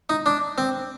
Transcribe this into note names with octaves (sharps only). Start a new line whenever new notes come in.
D#4
D4
C4